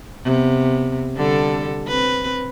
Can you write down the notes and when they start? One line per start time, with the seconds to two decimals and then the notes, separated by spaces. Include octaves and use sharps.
0.23 C3 B3
1.16 D3 G3 A4
1.87 C4 B4